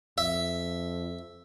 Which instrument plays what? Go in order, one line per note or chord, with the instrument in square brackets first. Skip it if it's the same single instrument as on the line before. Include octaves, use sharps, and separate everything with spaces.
[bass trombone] F2 [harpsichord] E5